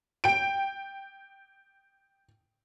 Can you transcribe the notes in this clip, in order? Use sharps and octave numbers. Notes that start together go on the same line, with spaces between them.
G5 D7